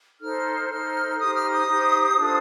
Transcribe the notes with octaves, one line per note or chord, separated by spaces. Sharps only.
D#4 A4 C5 F6
D#4 A4 C5 F6
D#4 G4 C5 D#6
F6
D#6
D#4 G4 C5
D4 F4 A4 C5